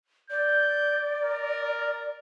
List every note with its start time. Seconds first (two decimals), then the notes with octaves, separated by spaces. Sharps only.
0.30 D5 G6
1.24 A#4